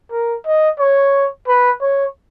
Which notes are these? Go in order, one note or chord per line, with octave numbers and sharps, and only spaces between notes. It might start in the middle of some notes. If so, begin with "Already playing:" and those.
A#4
D#5
C#5
B4
C#5